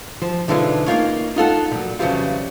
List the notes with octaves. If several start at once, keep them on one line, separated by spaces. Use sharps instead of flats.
F3
B1 D3 E3 G#3 D#4 F4
A#3 D#4 F4 C#5
D#4 F4 A4 F#5
A#2 F#3
F2 C#3 E3 F#3 G3 F4